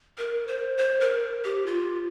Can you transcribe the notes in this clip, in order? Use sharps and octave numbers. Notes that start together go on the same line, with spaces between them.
A#4
C5
C5
A#4
G4
F4